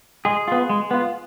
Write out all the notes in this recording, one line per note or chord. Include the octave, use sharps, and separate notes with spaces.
G#3 G#4
B3 F4
G#3
B3 F4